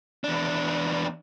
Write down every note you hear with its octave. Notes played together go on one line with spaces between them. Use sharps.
E2 D4